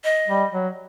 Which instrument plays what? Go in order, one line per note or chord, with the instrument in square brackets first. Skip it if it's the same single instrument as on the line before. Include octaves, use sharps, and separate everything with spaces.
[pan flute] D#5
[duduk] G3
F#3